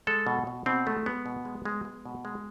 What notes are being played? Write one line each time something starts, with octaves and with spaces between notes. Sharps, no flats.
G#3 A4
B2
B2
B2 C4
G#3 A3
G#3 B3
B2
G#3
G#3
G#3
B2
G#3